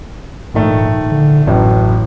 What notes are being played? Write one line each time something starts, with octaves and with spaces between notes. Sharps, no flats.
A#1 G#2 D#3 A3
D3
A1 F#2 A2 F#3